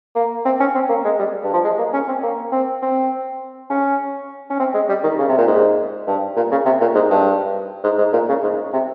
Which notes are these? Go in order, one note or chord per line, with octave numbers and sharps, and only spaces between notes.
A#3
C4
C#4
C4
A#3
G#3
G3
G2
F3
G#3
A#3
C#4
C4
A#3
C4
C4
C#4
C#4
C4
G#3
G3
D#3
C#3
C3
A#2
G#2
G2
A#2
C#3
C3
A#2
G#2
G2
G#2
G#2
A#2
C#3
G#2
C3